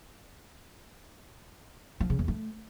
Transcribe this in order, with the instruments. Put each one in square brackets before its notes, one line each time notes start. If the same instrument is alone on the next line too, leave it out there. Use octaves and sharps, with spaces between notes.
[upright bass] F3
C#3
E2
A3